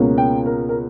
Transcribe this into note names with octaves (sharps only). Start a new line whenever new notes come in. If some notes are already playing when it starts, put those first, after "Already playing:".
Already playing: C#2 B2 A#3 C#4
G5
A#4
A#4